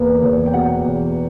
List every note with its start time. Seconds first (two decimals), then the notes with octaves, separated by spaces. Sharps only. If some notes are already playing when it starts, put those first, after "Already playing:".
Already playing: E2 A#3 B4
0.22 E2 C#5
0.46 G5
0.53 B2 F#5
0.85 E2